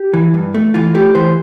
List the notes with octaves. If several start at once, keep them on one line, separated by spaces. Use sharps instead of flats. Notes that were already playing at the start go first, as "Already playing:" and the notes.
Already playing: G4
E3
G2
A3
E3 F4
A3 G4
E3 C5